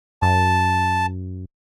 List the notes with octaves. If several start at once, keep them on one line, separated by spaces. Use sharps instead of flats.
F#2 A5